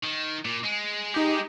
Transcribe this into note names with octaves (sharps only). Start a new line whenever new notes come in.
D#3
A#2
G#3
D#4 G4